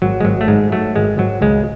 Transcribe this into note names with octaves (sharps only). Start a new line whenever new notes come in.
G#1 F#3
G#3
G#1 F#3
A3
G#2 G#3
F#3 A3
G#1 G#3
G#1 F#3
C#2 G#3